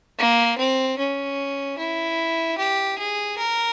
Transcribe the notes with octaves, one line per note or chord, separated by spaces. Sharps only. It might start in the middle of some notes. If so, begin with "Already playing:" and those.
A#3
C4
C#4
E4
G4
G#4
A#4